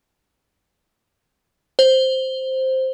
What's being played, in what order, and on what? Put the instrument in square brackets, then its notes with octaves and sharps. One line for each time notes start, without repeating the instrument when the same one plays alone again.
[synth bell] C5